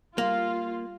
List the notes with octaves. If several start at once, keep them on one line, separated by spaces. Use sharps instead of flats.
G3 A#3 F4 F5